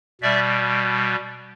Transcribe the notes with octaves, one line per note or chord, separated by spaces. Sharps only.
B2 G3 D5 E5